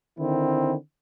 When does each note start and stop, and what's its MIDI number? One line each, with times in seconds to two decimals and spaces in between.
0.19 0.75 50
0.19 0.75 51
0.19 0.75 60
0.19 0.75 64